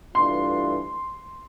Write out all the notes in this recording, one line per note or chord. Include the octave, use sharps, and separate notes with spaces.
G2 E3 A3 D4 F4 C6